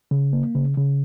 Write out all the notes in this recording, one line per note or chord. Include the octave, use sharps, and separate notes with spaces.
C#3
A#3
C#3
C#3